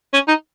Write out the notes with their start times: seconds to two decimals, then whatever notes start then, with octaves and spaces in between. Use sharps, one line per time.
0.13 C#4
0.28 D#4